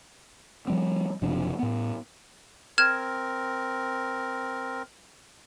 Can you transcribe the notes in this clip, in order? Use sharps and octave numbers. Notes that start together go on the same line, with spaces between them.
F3 G3 C4
F#1 C3 F3 D4
A2 B3
C4 A#4 F6 G#6 E7